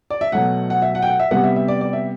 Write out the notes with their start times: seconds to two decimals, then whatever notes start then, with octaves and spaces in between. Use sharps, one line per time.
0.10 D5
0.21 E5
0.32 B2 F#3 A3 F#5
0.70 F#5
0.82 E5
0.95 F#5
1.02 G5
1.07 F#5
1.20 E5
1.31 C3 G3 B3 F#5
1.44 E5
1.56 E5
1.68 D5
1.81 D5
1.93 E5